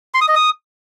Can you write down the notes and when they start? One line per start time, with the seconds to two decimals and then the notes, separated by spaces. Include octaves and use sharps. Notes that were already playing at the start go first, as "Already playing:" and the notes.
0.14 C6
0.21 D#6
0.28 D#5
0.35 D#6